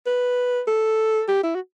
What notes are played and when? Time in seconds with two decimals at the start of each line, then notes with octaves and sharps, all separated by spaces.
0.06 B4
0.68 A4
1.28 G4
1.43 E4
1.55 F#4